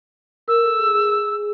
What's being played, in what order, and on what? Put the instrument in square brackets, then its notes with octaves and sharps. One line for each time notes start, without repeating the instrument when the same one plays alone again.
[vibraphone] A#4 [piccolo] E6
[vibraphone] A4
G#4
G#4